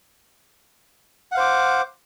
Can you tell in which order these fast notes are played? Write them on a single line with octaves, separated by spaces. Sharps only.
F#5 F5 C5 D6